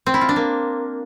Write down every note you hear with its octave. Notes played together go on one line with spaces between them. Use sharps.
C4
E4
F4
D4
A#3